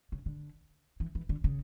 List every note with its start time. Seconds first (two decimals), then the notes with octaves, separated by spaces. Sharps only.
0.12 C#3
0.26 D3
1.00 E3
1.15 E3
1.29 D3
1.44 C#3